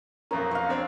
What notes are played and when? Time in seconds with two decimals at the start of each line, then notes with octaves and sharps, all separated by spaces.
0.31 B1 F2 C#4 A#4
0.51 C#5 F5
0.69 C4 D4